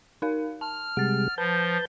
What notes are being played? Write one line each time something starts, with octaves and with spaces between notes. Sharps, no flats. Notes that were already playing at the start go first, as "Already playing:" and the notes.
D#4 A#4 F5
A5 F6
C3 G3 G#3 F#5 A6
F3 B4 A5 G6